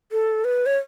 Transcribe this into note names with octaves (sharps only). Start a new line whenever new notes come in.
A4
B4
C#5